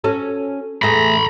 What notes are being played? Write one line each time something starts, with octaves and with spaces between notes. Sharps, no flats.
C#4 F#4 A4
E2 A3 G#4 A#5 B5